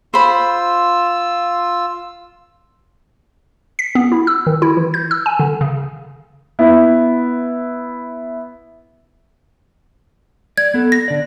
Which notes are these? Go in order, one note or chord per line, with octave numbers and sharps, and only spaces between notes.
F4 C5 B5 E6
B6
B3
E4
E6
D#3
E4
E3
G6
E6
G#5
D3
C#3
B3 E4
D5 G#6
B3 A4
A#6
D3 D5